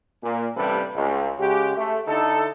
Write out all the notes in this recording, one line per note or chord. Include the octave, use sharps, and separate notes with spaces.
A#2
A1 G2 C3 G3 A4 B4
C#2
C#3 G#3 F#4 G4
A3
D3 D#4 E4 A4